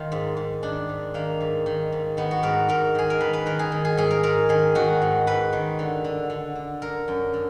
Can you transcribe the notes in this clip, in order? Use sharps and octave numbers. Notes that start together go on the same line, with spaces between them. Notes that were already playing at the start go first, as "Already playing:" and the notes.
Already playing: D#3 F4
G#2
G#2
D#3 D4
G#2
D#3 A#3
G#2
D#3
G#2
D#3 B3
F#4
G#2 A#4
G#2 A#4
D#3 G#4
A#4
D#3 B4
B4
D#3 A#4
G#4
D#3
G#4
G#2 G#4
A#4
G#2 A#4
D#3 G#4
D#3 F#4
G#2
G#2 B4
D#3
D3
D3
D3
D3
D3 A#4
F#2
D3